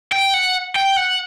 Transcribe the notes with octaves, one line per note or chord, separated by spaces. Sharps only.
G5
F#5
G5
F#5